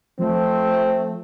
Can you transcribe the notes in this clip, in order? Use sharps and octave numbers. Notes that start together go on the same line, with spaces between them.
F3 A3 C4